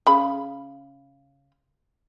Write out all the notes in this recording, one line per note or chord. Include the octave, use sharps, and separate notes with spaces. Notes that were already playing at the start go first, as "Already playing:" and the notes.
C#3 B5